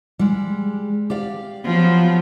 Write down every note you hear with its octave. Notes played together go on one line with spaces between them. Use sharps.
G3 G#3
G4 D5 F5
F3 F#3 B3